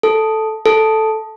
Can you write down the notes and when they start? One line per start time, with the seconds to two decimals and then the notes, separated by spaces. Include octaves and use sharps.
0.03 A4
0.66 A4